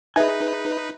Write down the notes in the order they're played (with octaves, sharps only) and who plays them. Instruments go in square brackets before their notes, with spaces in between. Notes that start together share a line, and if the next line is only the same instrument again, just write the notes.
[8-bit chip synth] D#4 B4 [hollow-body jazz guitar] G#4 G#5 [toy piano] D#5 E5